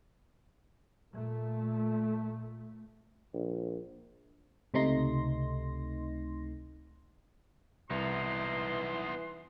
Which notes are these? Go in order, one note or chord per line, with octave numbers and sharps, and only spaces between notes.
A#2 A3
A#1
C#2 C3 A3 D#4 C6 A#6
C2 E3 B3 D#4 C6